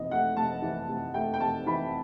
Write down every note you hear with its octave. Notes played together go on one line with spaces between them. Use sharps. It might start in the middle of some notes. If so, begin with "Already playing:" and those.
Already playing: C3 E3 D#5
A3 F#5
C3 A5
E3
C3
A3 G5
G5
C3 A5
E3 B5